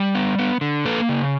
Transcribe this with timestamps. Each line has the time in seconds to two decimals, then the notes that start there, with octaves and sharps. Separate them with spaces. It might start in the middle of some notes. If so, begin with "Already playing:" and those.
Already playing: G3
0.15 B3
0.38 B3
0.61 D3
0.85 A#3 A4 B4
1.09 C#3